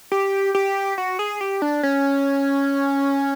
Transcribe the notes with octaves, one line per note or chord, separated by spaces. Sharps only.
G4
G4
F#4
G#4
G4
D4
C#4